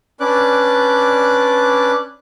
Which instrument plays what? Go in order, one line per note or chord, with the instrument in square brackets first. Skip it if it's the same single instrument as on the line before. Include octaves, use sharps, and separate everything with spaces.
[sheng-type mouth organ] C#4 D4 B4 D5 D6 F#6